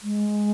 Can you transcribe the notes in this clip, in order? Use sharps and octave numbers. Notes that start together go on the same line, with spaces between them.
G#3